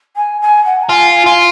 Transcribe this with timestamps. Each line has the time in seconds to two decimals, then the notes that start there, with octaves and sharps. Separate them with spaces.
0.16 G#5
0.41 G#5
0.65 F#5
0.83 A#5
0.89 F4 G#5
1.14 G#5
1.26 F4